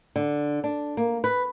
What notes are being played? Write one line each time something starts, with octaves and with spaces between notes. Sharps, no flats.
D3
D4
A#3
B4